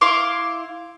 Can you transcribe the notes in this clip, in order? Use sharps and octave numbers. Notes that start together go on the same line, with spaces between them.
E4 F5 C6 D6